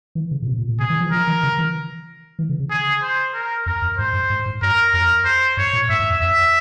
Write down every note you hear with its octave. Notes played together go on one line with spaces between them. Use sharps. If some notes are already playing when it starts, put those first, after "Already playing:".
E3
C#3
A#2
C3
A#2
A#2
C3 G#4
E3
F3
F3 A#4
E3
C#3
E3
E3
C#3
C#3
G#4
C5
A#4
F2 A#4
F2
G#2 C5
G2
G#2
G#2
G2 A#4
F2 A#4
C5
G2 C#5
A#2
G#2 E5
G#2
F2
F2 E5